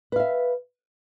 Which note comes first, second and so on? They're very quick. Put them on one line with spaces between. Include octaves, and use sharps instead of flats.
B4 F5 E5